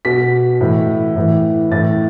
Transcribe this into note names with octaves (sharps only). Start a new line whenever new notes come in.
B2 B6
A2 E3
A2 E3
A2 E3 A6